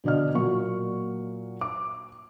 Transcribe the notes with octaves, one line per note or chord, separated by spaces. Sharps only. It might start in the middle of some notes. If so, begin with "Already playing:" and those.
B2 D3 D5 D#5 F6
A#2 F#3 A#3 C#6
D6